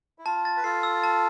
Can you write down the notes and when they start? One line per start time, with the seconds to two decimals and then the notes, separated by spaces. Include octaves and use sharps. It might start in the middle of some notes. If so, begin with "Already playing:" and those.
0.19 E4
0.26 F4 A5
0.45 A6
0.57 B4
0.64 F4 A4 C7
0.83 E6
1.03 A5